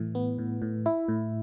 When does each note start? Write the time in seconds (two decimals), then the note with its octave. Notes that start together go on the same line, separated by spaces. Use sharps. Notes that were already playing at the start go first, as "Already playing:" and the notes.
Already playing: A2 E3
0.15 B3
0.38 A2
0.62 A2
0.86 E4
1.08 A2